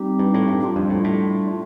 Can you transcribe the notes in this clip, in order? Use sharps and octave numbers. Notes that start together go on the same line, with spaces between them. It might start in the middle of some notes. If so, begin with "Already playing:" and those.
Already playing: G3 C4 D#4 G4
G2
A2
G2
G3 D4 F4
F2
A2
A2